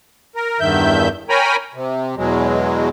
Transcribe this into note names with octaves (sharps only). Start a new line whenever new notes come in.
A#4
E2 G2 D#3 E5 G6
A#4 C#5 G5 G#5 A#5 B5
C3
E2 B2 F#3 G#3